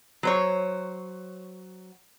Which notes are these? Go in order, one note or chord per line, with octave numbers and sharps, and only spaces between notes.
F#3 C5 C#5